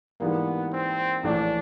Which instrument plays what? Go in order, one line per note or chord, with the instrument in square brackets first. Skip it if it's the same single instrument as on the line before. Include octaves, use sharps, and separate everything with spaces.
[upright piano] G#2 E3 G3 A#3 [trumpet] B3
[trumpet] C4
[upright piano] A#1 A2 E3 A3 [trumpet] D4